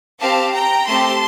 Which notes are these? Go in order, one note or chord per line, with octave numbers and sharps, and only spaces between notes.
C4 G4 F5 A5
G5 A#5
A3 C4 G4 A5 C6